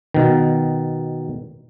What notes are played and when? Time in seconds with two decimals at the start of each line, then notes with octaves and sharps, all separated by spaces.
0.14 B2 D#3